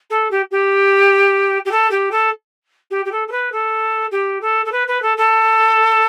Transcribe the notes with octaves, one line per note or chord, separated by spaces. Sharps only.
A4
G4
G4
G4
A4
G4
A4
G4
G4
A4
A4
B4
A4
G4
A4
A4
B4
B4
A4
A4